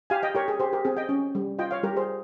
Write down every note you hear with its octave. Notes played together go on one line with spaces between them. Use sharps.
G4 F5 G#5
D#5 G5
G4 A#4 C#5
G#4
G4 G#4 C5
G4 A#4
C4 G#4
D#5 G5
C#4
G3
F4 D#5 G5
C#5 F5
G3 G4 A#4
G#4 C5